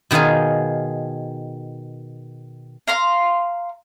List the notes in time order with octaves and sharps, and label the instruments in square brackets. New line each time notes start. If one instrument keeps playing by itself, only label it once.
[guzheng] B2 D#3 D#4 F4 G#4
[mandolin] F5 A#5 C6